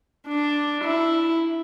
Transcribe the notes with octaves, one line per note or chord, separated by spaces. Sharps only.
D4
E4